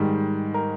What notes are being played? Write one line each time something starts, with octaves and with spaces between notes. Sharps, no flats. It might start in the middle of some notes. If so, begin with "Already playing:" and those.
Already playing: G#2 D#3 G3
A#4